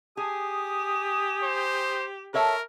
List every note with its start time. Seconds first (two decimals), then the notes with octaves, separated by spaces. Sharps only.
0.17 G4 G#4 G#5 D#6
1.44 C5
2.34 A4 A#4 C#5 E5